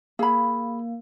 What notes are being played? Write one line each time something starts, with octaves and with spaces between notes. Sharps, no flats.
A#3 G#4 B5